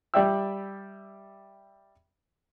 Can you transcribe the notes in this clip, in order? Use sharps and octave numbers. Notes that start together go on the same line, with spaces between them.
G3 G4 D5 E5 G5 E6